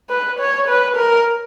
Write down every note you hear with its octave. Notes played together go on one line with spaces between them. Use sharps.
B4
C#5
B4
A#4